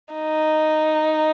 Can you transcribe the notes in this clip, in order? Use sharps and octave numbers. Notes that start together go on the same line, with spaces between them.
D#4